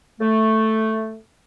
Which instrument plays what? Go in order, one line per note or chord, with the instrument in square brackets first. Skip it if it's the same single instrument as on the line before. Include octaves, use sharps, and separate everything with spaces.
[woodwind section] A3